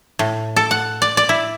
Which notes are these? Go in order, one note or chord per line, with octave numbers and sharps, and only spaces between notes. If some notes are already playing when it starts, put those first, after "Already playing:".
A2
A4
F#5
D5
D5
E4